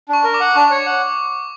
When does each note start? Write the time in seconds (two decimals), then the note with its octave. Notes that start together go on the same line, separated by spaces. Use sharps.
0.09 D4 C#6
0.24 A#4
0.34 D6
0.40 F#5
0.55 D4 C#6
0.71 C#5
0.86 F#5